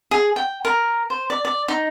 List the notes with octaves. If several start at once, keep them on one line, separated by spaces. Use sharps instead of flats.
G#4
G5
A#4
C5
D5
D5
D#4